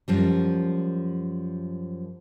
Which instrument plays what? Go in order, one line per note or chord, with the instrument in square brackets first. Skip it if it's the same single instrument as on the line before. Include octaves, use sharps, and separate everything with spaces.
[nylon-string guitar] F#2 F3 G3